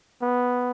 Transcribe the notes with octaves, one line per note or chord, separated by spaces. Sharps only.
B3